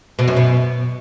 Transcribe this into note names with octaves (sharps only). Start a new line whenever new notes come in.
B2
F#2
B2